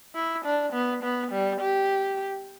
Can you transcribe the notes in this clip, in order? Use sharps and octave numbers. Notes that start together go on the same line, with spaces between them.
E4
D4
B3
B3
G3
G4